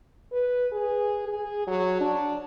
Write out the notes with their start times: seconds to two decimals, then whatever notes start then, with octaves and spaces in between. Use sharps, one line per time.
0.32 B4
0.72 G#4
1.28 G#4
1.67 F#3
2.00 D4